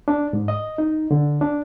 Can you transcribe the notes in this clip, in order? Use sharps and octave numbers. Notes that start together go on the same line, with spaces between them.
D4
G#2
D#5
D#4
D3
D4